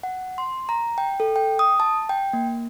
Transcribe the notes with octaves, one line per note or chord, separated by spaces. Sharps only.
F#5
C6
A#5
G5
A4
G5
D#6
A5
G5
A#3